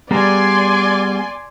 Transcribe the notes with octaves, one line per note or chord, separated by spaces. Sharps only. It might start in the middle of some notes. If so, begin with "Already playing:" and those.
G3 B3 G#4 D5 G#5 A#5 C6